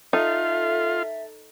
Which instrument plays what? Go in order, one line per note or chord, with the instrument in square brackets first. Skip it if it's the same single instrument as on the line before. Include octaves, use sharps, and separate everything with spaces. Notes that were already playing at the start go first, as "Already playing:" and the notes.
[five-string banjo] D#4 [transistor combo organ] F4 [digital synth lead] A4 [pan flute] E5